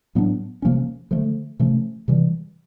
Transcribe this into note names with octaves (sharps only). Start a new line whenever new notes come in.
A2 F#3 B3 D4
C3 F3 A#3 C#4
D3 F3 A3
C3 F3 A3 C#4
C3 E3 G3